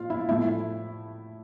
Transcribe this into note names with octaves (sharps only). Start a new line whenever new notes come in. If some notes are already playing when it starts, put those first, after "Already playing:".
Already playing: A#2 F3 F4 F5
E4 E5
A2 F3 A3 E4 E5